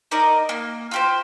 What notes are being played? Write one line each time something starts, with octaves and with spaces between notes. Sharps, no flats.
D#4 A#4 D5 D#5
A#3
F4 G4 C5